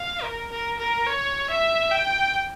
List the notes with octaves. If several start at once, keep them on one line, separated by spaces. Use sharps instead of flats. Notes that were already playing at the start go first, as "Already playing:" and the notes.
Already playing: F5
A#4
A#4
A#4
C#5
E5
G5